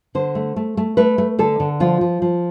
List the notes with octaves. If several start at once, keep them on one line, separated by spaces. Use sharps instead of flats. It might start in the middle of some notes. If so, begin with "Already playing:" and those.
D3 C5
A3
A3
A3
A3 B4
A3
D3 A4
D3
F3 F4
F3
F3